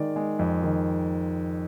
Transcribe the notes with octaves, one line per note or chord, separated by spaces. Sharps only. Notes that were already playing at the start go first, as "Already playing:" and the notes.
Already playing: D#3 G#3 D5
G#3
F2
D#3